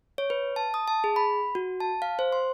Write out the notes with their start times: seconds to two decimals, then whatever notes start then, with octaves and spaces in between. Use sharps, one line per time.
0.18 C#5
0.30 B4
0.56 A5
0.74 D#6
0.88 A5
1.04 G#4
1.16 B5
1.55 F#4
1.80 A5
2.02 F5
2.19 C5
2.32 C6